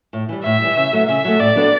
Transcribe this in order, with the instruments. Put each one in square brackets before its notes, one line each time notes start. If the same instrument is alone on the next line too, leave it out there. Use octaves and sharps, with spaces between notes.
[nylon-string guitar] A2
E3 G3
[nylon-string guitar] A2 [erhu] E5
[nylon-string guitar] E3 G3
C#3
F#3 A3
[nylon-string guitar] C#3 [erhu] E5
[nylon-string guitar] F#3 A3
[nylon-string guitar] A2 [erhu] D5
[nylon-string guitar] F#3 B3 D4 A4